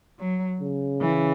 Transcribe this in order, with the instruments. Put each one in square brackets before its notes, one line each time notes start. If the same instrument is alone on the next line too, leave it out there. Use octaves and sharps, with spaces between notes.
[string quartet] F#3
[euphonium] C#3
[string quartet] E3